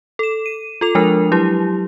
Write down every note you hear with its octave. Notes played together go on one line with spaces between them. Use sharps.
A4 E7
D#7
F4 A4 F7
F3 G#3 D4 A#4
F#3 E4 G4